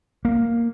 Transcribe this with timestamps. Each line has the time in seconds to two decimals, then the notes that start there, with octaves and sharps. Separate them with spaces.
0.25 A#3